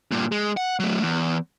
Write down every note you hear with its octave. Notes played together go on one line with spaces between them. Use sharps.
G2 A#2
G#3
F#5
F#3 A3
E2